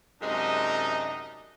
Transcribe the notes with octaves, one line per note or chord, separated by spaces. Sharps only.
F#2 C3 G#3 D4 D#4